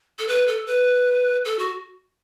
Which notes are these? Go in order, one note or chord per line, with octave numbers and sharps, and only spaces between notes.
A4
B4
A4
B4
A4
F#4